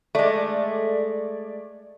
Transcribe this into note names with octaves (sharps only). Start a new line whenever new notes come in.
G#3 A3 D5